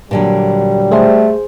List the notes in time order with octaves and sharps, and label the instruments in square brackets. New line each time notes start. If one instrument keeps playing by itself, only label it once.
[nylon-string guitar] A#2 D3 F#3 [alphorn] G3
[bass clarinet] A3 [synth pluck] G#4 C5